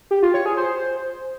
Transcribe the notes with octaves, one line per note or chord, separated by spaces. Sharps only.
G4
F4
C#5
G#4
C5